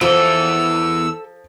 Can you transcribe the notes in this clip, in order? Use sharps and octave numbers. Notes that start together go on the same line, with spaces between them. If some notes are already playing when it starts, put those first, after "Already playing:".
E2 E3 F3 A4 E6